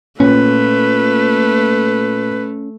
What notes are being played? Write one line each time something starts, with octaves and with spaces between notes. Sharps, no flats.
A#2 A3 C#4 B4